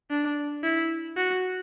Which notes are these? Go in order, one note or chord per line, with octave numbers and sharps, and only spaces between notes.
D4
E4
F#4